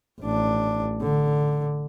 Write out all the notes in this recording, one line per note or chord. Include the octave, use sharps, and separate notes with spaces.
A1 D4
D3